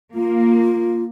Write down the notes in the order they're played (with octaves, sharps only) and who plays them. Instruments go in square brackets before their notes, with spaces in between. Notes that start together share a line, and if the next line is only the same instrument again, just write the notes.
[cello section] A#3 [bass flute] F4